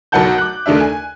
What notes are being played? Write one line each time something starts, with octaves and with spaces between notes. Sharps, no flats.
B1 F#3 A#4 F#5 A5 G6
D6 F#6
D#2 D#3 A3 D4 E5
G#5